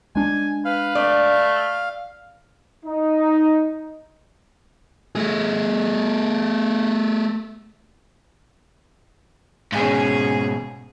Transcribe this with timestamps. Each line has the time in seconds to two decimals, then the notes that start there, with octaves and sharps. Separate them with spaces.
0.15 G#3 D4 G#5
0.65 B4 F5
0.95 A3 D5
2.85 D#4
5.15 A3 G#4
9.72 G#2 B2 C#4 G#4